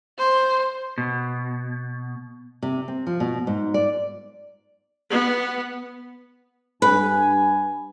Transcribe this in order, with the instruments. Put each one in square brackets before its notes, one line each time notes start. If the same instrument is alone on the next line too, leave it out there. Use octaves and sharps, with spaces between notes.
[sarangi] C5
[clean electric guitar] B2
[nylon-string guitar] C3
C4
F3
B2
G#2
D5
[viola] B3
[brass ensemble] G2 G#5 [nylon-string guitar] B4